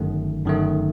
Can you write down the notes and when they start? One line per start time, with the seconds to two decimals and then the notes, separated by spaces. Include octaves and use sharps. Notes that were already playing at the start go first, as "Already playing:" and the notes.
Already playing: G1 F#2 D#3 A3
0.45 G1 F#2 D#3 A3